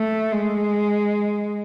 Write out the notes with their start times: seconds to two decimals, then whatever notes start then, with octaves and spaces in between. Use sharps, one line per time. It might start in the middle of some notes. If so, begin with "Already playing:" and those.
Already playing: A3
0.32 G#3